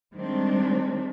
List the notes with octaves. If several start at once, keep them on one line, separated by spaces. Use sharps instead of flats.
D#3 G3 G#3 C4 D4